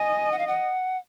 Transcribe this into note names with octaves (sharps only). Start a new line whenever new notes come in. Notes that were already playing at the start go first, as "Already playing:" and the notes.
Already playing: D#5 G#5
F#5
F5
F#5